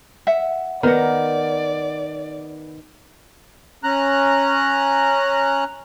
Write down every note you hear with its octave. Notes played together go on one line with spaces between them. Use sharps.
E5 F#5
D#3 B3 A#4 D5 F#5
C#4 A#5 F#6